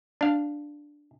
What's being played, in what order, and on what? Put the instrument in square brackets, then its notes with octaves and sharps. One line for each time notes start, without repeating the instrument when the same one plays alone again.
[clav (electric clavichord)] D4 F5